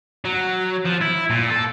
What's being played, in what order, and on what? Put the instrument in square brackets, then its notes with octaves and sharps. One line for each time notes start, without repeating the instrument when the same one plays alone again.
[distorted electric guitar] F#3
F3
E4
A#2
A4